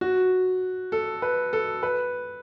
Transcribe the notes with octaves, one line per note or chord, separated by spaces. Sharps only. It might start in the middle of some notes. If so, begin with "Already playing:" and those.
F#4
A4
B4
A4
B4